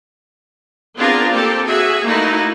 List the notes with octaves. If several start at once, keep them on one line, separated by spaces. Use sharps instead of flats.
B3 C4 D4 F4 G#4 A#4
A#3 C4 G4 A4
F#4 G#4 E5
A3 A#3 D#4 E4 F#4